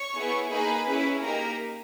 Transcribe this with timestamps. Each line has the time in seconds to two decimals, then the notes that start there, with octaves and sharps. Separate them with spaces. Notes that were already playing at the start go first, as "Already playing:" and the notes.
Already playing: C#5 C#6
0.16 B3 E4 G#4
0.52 A#3 D#4 G#4 B4 B5
0.87 C#4 E4 G#4
1.22 A#3 D#4 G4 A#4 A#5